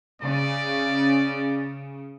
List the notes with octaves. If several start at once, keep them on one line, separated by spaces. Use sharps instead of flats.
C#3 D5